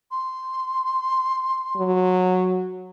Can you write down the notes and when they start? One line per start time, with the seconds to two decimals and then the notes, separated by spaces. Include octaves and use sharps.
0.11 C6
1.76 F#3